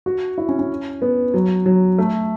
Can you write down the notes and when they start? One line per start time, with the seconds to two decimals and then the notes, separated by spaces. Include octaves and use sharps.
0.06 F#4
0.38 E4
0.49 C#4
0.59 C#4
1.02 B3
1.34 F#3
1.66 F#3
1.98 A3